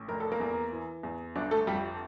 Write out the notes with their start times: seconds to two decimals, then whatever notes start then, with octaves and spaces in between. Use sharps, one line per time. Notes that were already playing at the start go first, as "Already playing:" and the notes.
Already playing: A1
0.08 F1 A#4
0.20 A4
0.32 A#3 A#4
0.40 E2
0.73 E3
1.03 E2
1.36 G1 D4
1.51 A3 A4
1.67 F2 G3 G4